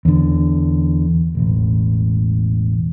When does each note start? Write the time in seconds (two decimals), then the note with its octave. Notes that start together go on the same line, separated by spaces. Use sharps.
0.05 E2 D3
1.35 E1 A1